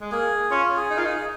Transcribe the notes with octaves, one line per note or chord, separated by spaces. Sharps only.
G#3
A#3 G#4
C#4 F4
G#4
D#4
F4 A#4
D#4 G#4